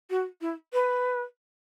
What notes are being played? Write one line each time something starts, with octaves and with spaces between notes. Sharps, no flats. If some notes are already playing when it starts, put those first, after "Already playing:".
F#4
E4
B4